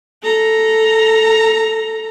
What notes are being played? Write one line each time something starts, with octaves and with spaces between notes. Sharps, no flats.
A4 A#5